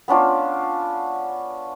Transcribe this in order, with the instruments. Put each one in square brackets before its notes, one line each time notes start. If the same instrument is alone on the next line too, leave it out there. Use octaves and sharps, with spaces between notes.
[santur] B3 C#4 D4 F4